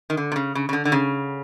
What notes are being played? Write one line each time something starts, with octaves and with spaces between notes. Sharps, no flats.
D#3
D3
C3
C#3
C#3
C#3
D3
D3
C#3